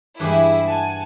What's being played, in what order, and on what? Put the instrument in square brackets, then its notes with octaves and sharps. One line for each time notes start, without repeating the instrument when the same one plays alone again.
[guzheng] G2 E3 G4 [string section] G#3 E4 G#4
[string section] F#5 G#5 A5